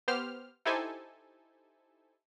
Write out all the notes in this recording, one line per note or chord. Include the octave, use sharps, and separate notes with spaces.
B3 G4 C5 F6
D#4 E4 G4 A4 C5 G#5